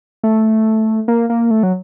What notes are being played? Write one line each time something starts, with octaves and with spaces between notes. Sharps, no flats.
A3
A#3
A#3
A3
F#3